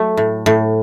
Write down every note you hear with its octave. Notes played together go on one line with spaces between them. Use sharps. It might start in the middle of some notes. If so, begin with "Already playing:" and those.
Already playing: F#3 A3
A2
A2